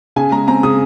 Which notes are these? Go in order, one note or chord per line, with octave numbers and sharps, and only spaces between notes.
C#3 G#5
G#3 A#5
C4 A#5
C#3 D#6